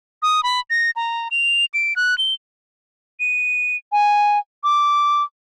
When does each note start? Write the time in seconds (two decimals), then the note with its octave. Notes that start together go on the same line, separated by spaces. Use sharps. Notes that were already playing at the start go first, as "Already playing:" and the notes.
0.22 D#6
0.43 B5
0.70 A#6
0.96 A#5
1.31 F7
1.74 D7
1.96 F#6
2.18 G7
3.20 D#7
3.92 G#5
4.64 D6